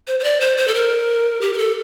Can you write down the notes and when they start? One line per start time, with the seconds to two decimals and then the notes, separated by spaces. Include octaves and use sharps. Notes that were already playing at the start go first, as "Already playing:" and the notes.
0.07 C5
0.20 C5
0.24 D5
0.41 C5
0.57 C5
0.68 A4
0.75 A#4
1.41 G4
1.53 A#4
1.58 A4